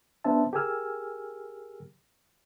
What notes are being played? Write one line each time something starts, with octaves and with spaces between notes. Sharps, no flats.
B3 C#4 D4 C5 E5 A5
G4 G#4 A#4 G#5 E6 F6